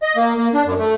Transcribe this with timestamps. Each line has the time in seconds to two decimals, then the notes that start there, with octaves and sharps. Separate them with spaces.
0.02 D#5
0.16 A#3
0.38 A#3
0.54 D4
0.66 F#2
0.78 A3